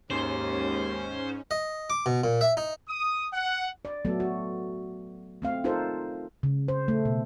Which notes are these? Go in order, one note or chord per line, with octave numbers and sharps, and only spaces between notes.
D#2 G#2 C#4 C5
D#5
D6
B2
A#2
E5
D#4
D#6
F#5
D5
F#3 A3 B3 A4
F#4
A3 C4 F5
D#4 F4 A4 A#4 C5
C#3
C5
A3
B2